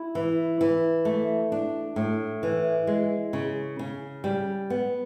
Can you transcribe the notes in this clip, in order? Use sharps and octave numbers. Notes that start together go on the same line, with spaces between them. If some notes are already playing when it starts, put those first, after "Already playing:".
Already playing: E4
E3
E3
A3
D4
A2
E3
G#3
C#3
C#3
G3
B3